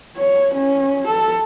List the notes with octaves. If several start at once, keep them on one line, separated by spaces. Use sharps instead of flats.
C#5
C#4
A4